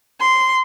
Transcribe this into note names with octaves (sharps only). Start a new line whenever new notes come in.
C6